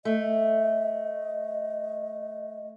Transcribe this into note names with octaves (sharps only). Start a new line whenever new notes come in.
A3 D#5